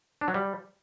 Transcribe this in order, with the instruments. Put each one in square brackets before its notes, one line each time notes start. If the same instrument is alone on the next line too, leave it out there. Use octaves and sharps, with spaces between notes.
[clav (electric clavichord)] D4
F#3
G3